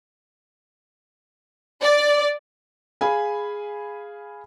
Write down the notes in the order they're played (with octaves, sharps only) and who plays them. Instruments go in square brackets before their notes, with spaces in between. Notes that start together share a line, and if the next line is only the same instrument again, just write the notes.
[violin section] D5
[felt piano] G#4 F5 G#5 B5